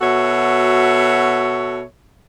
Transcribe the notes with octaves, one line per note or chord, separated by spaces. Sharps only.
B2 F#4 A4 C#5 E5